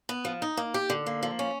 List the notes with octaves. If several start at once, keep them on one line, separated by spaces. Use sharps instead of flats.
B3
F3
D#4
A#3
G4
D3
A#3
F3
C#4